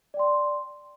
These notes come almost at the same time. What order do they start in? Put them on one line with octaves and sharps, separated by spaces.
D5 G5 C6